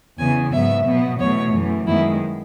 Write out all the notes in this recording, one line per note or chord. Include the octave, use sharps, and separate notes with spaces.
E2 C#3 E3 B3 G#5
G#2 F#3 B3 E5
B2 F#3 B3
E2 B2 A3 C#5
F#2 E3 A3
F#2 D#3 G#3 B3 E4